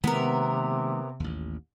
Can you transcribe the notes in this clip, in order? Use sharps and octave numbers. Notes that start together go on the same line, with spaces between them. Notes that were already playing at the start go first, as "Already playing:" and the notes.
C3 D#3 G#3 A#3 B3 A#4
A1 D#2